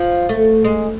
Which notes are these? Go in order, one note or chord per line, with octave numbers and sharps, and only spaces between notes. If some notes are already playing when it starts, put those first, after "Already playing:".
Already playing: F3
A3
G#3